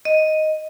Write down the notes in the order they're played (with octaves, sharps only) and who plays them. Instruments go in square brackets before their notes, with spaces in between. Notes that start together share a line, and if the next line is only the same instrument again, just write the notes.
[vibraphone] D#5